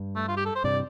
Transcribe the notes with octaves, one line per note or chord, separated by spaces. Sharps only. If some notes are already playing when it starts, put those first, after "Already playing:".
Already playing: G2
A3
F4
G4
A4
C5
G2 C3 D5